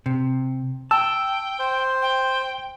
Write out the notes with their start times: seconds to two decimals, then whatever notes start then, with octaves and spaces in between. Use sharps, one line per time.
0.06 C3
0.91 G5 A5 E6
1.59 C5
2.02 G5